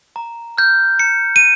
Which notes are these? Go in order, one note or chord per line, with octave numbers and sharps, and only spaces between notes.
A#5
F6 G6
A#5 C#7
D#7